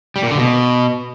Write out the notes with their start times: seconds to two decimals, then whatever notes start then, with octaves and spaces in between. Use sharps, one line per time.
0.16 G3
0.23 A#2
0.31 D3
0.38 B2